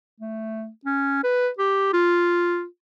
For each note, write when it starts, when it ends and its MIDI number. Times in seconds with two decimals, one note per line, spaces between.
0.20 0.68 57
0.85 1.22 61
1.23 1.49 71
1.59 1.89 67
1.93 2.65 65